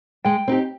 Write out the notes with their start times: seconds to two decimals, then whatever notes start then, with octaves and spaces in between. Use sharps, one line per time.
0.25 G#3 G5
0.48 C4 D#4 G4